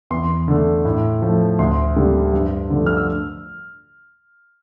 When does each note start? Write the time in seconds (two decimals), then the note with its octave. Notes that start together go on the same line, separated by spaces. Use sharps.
0.10 E2 C6
0.48 D3 A3
0.85 A2
1.22 F3 A3
1.59 D2 C6
1.96 D3 G3 A#3
2.34 G2
2.70 D3 F3 A3
2.86 F6
2.97 E6